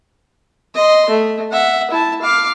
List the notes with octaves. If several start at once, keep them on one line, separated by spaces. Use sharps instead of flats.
D#5 C6
A3
E5 F#5
E4 A5
F5 D6